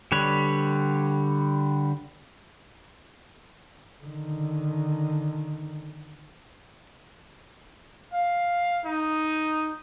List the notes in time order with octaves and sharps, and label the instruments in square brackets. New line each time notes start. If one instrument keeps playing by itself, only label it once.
[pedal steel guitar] D3 G3 B4 C#5
[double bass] D3 D#3
[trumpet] F5
D#4